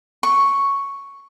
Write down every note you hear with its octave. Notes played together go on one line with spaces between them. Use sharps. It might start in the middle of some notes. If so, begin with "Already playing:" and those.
C#6